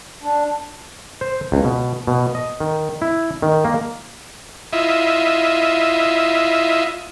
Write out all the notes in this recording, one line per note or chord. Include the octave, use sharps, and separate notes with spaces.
D4
C5
C#2
B2
B2
D#5
D#3
E4
D#3
A#3
E4 F4 D#5 E5